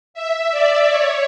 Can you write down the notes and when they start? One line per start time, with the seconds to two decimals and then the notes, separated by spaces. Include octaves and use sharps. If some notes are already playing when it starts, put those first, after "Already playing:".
0.14 E5
0.51 D5
0.88 C#5